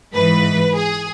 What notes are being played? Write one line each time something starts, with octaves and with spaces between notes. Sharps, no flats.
G#2 E3 B4
G#4